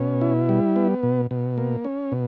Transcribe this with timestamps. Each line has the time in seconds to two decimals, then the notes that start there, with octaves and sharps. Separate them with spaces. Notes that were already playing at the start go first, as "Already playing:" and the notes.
Already playing: B2 C#4
0.21 E4
0.49 G3
0.76 B3
1.03 B2
1.31 B2
1.58 A#3
1.84 C#4
2.12 B2